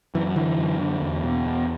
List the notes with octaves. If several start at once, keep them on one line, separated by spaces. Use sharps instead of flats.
F#2 E3
D3 E3
F#2
D3
E2
B2
E2